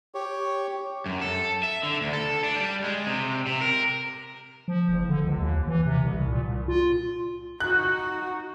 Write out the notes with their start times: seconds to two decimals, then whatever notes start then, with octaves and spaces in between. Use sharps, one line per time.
0.15 G4 C#5
1.06 F#2
1.21 A4
1.63 E5
1.83 D3
2.01 D2
2.13 A4
2.44 D4
2.55 G3
2.84 G#3
3.07 C3
3.47 C3
3.61 A#4
4.68 F3
4.89 F#1
5.09 D3
5.24 C#2
5.39 D#2
5.68 E3
5.86 C3
6.03 C2
6.29 A#2
6.42 C2
6.68 F4
7.60 D#4 F#4 F#6